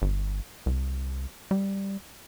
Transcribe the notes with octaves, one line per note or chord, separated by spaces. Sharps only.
G1
C2
G3